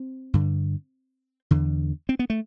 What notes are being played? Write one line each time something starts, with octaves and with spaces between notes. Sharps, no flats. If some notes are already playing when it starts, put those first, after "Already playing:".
Already playing: C4
G2 D3
E2 D3
C4
B3
A3